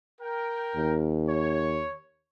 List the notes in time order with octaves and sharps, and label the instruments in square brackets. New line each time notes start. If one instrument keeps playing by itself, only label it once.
[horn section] A#4 G5
[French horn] D#2
[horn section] C#5